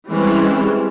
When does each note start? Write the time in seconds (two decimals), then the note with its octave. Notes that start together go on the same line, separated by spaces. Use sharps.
0.10 E3 G3 G#3 C4 C#4